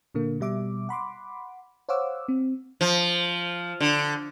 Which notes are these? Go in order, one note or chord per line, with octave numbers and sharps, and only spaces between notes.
A#2 D3 A#3
B2 G3 E5 D6
F#5 B5 C6 D6
C5 C#5 F5 F#5 D6 E6
C4
F3
D3